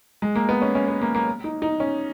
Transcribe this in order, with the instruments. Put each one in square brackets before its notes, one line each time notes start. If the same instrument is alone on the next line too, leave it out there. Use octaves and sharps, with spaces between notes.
[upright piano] G#3
A#3
B3
C#4
C#4
B3
A#3
A#3
D#4
D#4
C#4